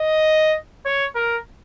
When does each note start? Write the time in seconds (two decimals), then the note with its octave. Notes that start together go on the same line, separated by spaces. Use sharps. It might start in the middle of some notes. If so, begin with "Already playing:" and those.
Already playing: D#5
0.86 C#5
1.15 A#4